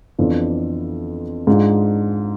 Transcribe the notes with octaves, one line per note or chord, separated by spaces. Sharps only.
F2 E3 B3 D4 F4
G#2 G#3 D4 F4